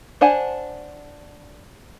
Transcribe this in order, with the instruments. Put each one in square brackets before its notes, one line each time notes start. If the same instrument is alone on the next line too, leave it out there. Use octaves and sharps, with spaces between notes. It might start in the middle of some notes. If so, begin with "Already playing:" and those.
[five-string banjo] D4 C5 F#5 G#5